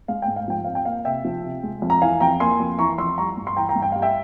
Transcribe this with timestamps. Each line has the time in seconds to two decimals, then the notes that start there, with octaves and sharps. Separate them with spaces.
0.08 G#3 F5
0.22 G5
0.28 G#2
0.36 F5
0.48 F3 G5
0.64 C4 F5
0.75 G5
0.85 A#3 F5
1.05 C3 E5 G5
1.25 F3
1.44 C3
1.63 G#3
1.82 F2
1.90 A#5
2.02 E3 F5 G#5
2.20 F2 G5 A#5
2.40 A#3 G#5 C6
2.60 F2
2.79 E3 A#5 C#6
2.98 F2 C6 E6
3.18 G3 A#5 C#6
3.37 G2
3.47 C6
3.56 E3 G5 A#5
3.69 G5 A#5
3.76 G2
3.82 G5
3.92 G3 F5
4.02 E5 G5